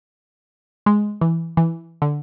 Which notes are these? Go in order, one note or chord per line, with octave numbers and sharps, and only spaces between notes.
G#3
E3
E3
D3